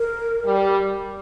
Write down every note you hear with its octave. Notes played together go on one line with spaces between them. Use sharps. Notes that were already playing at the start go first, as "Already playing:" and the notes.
Already playing: A#4
G3